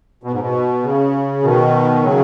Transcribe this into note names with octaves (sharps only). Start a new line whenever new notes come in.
B2
G#2
B2
C#3
B2 D#3
C#3 F#3